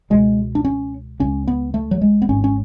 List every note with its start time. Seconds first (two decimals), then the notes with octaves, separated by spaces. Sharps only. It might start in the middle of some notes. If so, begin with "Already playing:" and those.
0.10 C#2 B2 G#3
0.55 D4
0.65 C#4
1.20 C#2 C#3 C#4
1.48 B3
1.74 A3
1.91 F#3
2.01 G#3
2.22 B3
2.29 G#1 G#2 C#4
2.44 C#4